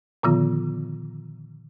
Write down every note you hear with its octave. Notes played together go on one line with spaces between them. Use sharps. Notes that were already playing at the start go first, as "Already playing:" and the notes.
A#2 D3 D#3 F3 B3 F4